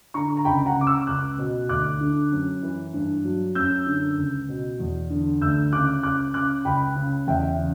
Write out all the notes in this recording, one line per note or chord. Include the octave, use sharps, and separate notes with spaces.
D3 A#5 C#6
A#5
C#2 G5 B5
F#5 A#5
C#3 D6
C#6 E6
C#2 D6 F#6
B2
D2 D6 F#6
D3
F#2
E3
G2
F#3
F#2 E6 G6
D3
C#2
B2
E2
D3
D2 E6 G6
C#3 D6 F#6
C#2 D6 F#6
C#3 D6 F#6
C#2 G5 B5
C#3
E2 E5 G5
C#3